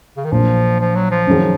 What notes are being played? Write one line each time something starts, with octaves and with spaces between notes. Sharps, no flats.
C#3
D#3
A#1 A#2 F3 F#3
F3
F#3
F3
F#2 D#3 F#3 C#4 G#4